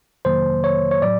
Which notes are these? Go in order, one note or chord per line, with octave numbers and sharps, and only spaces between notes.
F2 C3 D#3 F#3 A#3 C5
C#5
C#5
A2 F#3 D5